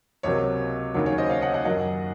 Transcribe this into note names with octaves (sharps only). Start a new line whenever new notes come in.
C#2 C3 F#3 A#3 C#5
D#2 C#3 F#3 A#3 C#5
C#5
C5 D#5
C#5 F5
D#5 F#5
D#5 F#5
F#2 D#3 F#3 A#3 D#5 F#5